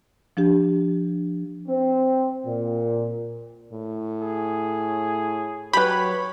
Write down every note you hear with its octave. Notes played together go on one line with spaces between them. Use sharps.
F3 D4 G4
C4
A#2
A2
G#4
F#3 G4 B4 C#5 B5